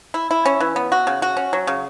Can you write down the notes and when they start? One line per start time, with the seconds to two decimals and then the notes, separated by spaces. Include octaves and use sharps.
0.14 E4
0.31 E4
0.46 C#4
0.60 E3
0.76 B3
0.92 F#4
1.07 C#3
1.22 F#4
1.37 C#4
1.53 F#3
1.67 C#3